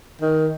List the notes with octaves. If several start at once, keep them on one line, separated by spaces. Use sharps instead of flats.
D#3